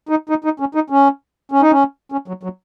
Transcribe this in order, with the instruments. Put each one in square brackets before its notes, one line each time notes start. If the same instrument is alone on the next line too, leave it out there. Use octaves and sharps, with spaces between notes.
[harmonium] D#4
D#4
D#4
C#4
D#4
C#4
C#4
D#4
C#4
C#4
F#3
F#3